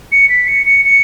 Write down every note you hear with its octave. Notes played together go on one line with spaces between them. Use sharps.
C#7
B6
C#7
C#7
C#7